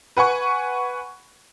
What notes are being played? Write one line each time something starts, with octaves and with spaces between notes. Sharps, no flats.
B4 F#5 G#5 C#6